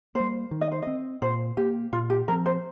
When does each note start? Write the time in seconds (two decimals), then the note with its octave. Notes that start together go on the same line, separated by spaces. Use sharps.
0.15 G3 A#3 C5
0.51 D#3
0.61 D#5
0.72 C5
0.82 C4 D#5
1.22 A#2 C5
1.57 A#3 G4
1.93 A#2 F4
2.10 G4
2.28 F3 C4 A#4
2.46 C5